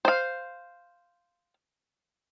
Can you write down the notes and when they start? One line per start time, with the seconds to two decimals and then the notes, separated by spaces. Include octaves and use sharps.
0.05 C5 F5